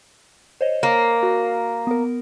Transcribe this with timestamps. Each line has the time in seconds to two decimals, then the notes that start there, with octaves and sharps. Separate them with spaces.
0.61 C5 C#5 D#5
0.83 A#3
1.23 F#4
1.87 B3 A#4